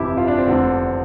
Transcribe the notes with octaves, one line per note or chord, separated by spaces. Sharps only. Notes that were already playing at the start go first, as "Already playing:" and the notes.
Already playing: G1 F2 C3 E3 E4 G4
F4
D4
C4
F1 E2 D3